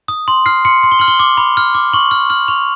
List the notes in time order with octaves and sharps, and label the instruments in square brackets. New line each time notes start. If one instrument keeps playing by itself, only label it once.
[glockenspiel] D#6
C6
F6 C7
C6 C#7
C6
G7
F6 F#7
G7
D6
B5
F6
D6
C#6 F#7
F6
F6 F#7
C#6 F7